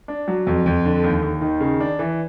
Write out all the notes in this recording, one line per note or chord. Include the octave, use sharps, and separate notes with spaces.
D4
F#3
F2
F2
D3
D#2
D#2
D#3
C#3
D4
E3